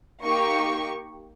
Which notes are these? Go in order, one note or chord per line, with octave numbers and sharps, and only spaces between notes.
A#3 D#4 G4 C#6